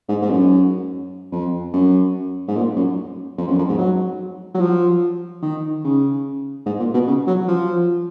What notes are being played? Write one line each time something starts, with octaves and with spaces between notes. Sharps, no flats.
G#2
G#2
F#2
F2
F#2
G#2
A#2
F#2
F2
F#2
F2
G#2
F#3
F#3
F3
D#3
C#3
G#2
A#2
B2
C#3
F#3
F3